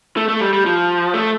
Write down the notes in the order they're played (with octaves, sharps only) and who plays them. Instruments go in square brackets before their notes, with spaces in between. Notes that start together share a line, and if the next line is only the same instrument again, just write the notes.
[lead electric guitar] A3
A3
G3
G3
F3
A3